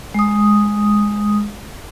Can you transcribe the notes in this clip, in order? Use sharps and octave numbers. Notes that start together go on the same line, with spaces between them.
G#3 D#6